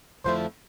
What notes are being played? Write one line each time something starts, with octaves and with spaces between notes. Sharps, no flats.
F2 D3 F3 A3 E4 C5